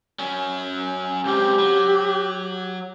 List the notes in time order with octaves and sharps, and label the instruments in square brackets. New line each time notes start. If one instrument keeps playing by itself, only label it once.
[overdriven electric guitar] F#3 C#4
[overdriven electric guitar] C#2 C4 [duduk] G4
[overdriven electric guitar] F#3